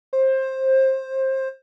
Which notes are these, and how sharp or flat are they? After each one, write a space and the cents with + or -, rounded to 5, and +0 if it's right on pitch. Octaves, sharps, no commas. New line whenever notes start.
C5 +20